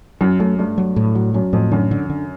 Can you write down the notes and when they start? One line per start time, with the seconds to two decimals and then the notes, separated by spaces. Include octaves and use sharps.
0.21 F#2 F#3
0.40 F#2 A3
0.59 G2 A3
0.78 F#3
0.96 A2
1.15 F#3
1.34 F#2 F#3
1.53 F2 A2
1.72 F#2 D3
1.91 D3
2.10 D3